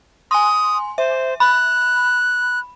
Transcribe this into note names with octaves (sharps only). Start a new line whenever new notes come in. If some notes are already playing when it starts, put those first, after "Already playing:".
G#5 C6 D#6
C5 E5
B5 F#6